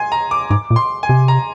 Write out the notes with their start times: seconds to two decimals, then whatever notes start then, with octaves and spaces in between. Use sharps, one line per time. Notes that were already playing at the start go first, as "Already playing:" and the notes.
Already playing: G#5 C6
0.12 A#5
0.31 D6
0.50 G#2 D6
0.70 A#2
0.76 C6
1.03 G#5
1.09 C3
1.28 A#5